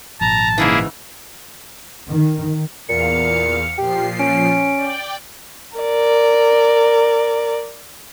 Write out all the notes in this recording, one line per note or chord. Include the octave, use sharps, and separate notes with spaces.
G#1 A#2 F3 A5 A#5
G#2 C#3 E3 A#3 E4 G#4
D#3
E2 A#2 F5 C#7
A#2 F3 G4 C7
C#4 D7
D5 G5
A#4 D5